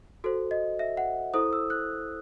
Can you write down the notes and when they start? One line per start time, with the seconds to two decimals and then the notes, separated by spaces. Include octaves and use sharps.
0.24 F#4 A4 C5
0.51 D#5
0.79 E5
0.97 F#5
1.34 E4 A4 C5 D#6
1.53 E6
1.70 F#6